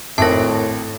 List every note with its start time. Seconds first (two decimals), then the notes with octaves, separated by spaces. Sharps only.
0.18 G#1 A2 A#4 E5 A5 A#6